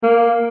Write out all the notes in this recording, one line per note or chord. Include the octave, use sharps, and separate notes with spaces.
A#3